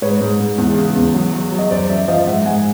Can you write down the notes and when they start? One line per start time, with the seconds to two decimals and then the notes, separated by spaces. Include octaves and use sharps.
0.02 G#2 B4 C#5
0.21 G#2
0.40 G#2
0.58 E2
0.77 C#3
0.95 E2
1.14 F#3
1.34 F#3
1.52 F#3
1.59 D#5
1.70 F#2 C5 D5
1.89 F#2 D5 E5
2.08 F3 D#5 F5
2.27 G#2 E5 F#5
2.45 G#2 F#5 G#5